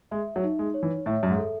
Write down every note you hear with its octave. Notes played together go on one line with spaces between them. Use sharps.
G#3 E5
F#3
D#4
G#3
C#5
E3
A2 E5
F#2
G#2
A4